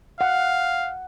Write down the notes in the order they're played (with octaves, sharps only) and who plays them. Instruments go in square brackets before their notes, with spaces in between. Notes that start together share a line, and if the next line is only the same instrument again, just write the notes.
[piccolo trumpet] F5 [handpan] F#5